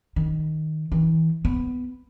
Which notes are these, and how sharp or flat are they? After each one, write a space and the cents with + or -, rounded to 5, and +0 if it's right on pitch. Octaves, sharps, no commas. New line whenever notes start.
D#3 +5
E3 -35
B3 +15